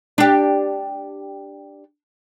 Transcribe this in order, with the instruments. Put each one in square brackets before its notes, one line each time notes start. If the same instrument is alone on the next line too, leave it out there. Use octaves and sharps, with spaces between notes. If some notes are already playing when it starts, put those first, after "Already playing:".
[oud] D4 G4